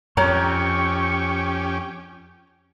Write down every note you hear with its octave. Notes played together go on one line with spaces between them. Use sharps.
F2 C#4 G4 C#5 A#5 C#6